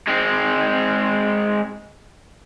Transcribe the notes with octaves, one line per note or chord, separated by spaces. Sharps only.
G#3 C4